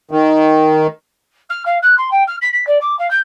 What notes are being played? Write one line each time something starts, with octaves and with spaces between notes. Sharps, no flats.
D#3
F6
F5
F#6
C6
G5
F6
B6
B6
D5
D6
F5
G6